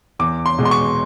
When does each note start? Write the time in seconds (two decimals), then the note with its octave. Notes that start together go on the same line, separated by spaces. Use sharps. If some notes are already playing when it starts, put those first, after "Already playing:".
0.19 E2 D6
0.46 C6
0.58 B2 G#3
0.65 C6
0.71 C#6